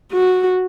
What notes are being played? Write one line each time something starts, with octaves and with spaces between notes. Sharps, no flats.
F#4